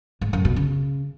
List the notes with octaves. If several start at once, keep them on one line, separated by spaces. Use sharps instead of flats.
G#2
F#2
B2
C#3